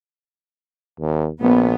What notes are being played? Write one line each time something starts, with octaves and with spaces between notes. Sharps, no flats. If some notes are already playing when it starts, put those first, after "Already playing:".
D#2
A#1 B3